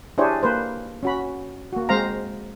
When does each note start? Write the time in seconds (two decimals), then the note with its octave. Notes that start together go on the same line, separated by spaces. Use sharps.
0.18 D4 E4 G4 G#4 C5 C#5
0.43 A#3 B4 C5
1.03 C#4 F#4 B5
1.73 A#3 F#4
1.89 G#3 C4 C5 F5 A#5